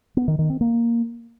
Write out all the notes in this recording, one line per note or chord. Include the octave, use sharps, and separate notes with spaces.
B3
D#3
D#3
C4
A#3